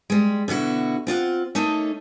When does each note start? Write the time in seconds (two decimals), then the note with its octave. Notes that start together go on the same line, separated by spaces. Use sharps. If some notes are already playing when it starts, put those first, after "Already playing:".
0.10 G3 G#3
0.48 B2 D3 E4 F#4
1.07 C4 F4 D5 F#5
1.55 A3 A#3 C#4 D#4 A4